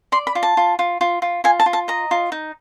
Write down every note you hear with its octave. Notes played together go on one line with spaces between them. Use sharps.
D5 C6
B5
F4
A5
F4
F4
F4
F4
F4 G#5
A5
F4
A5
D#5 A#5
F4
D#4